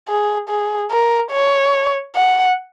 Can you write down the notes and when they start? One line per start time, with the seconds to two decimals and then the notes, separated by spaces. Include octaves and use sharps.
0.09 G#4
0.49 G#4
0.91 A#4
1.32 C#5
2.15 F#5